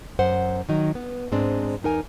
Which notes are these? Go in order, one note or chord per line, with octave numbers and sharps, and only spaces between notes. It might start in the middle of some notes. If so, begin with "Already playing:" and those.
F#2 C5 F#5
D#3 F#3 D#4
B3
G#2 G#3 C4 D4
E2 D#4 A#4 G#5